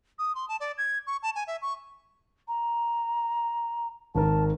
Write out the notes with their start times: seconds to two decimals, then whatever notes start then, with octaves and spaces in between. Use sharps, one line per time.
0.19 D#6
0.35 C6
0.49 A5
0.60 D5
0.78 G#6
1.07 C#6
1.23 A5
1.36 G#5
1.47 E5
1.62 C#6
2.48 A#5
4.15 G#1 D#3 A#4 A5